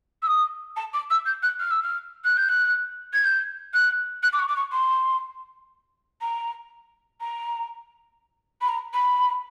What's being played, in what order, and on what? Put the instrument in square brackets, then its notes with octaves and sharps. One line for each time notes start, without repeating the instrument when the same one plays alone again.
[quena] E6
D#6
A5
D6
E6
G6
F#6
F6
E6
F6
F#6
G6
F#6
G#6
G6
F#6
F#6
D6
C#6
D6
C#6
C6
A#5
A#5
B5
A#5
B5